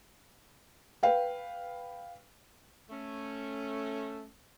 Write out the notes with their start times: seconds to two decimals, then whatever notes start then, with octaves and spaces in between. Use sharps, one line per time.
1.03 B4 F5 G5
2.90 A3 C#4